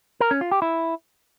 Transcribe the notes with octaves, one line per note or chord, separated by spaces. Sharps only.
A#4
C#4
F4
G4
E4